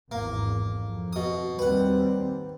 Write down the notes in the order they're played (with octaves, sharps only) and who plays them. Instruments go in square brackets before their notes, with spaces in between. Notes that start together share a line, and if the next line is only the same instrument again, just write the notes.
[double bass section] G#1 E2 [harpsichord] A#3
[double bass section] F2
[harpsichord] B2 D#6
[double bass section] D#2 G3 C4 [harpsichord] B4 F#5